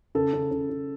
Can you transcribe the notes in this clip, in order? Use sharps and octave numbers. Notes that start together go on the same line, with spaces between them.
C#3 A4
C#3
C#3
C#3